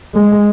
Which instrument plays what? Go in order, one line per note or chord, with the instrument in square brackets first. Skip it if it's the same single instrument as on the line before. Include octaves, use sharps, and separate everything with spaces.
[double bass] G#3